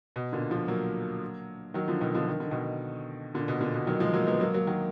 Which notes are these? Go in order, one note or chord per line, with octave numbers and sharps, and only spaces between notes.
B2
A#2 D3
D3 F3
F#3 A#3
D#3 F#3
D3 F3
B2 D#3
D3 F3
D#3
D3
B2 D#3
A#2 D3
B2
A#2 D3
B2
D#3 F#3
F3 G#3
F#3 A#3
G#3 B3
F#3 A#3
F#3 A#3
D#3 F#3